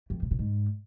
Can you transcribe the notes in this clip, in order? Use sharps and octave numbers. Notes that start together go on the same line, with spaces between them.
F2
C3
B2
G#2